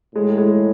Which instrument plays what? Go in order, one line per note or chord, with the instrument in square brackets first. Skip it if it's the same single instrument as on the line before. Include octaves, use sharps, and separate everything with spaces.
[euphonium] A2 [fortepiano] G#3
[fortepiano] G#3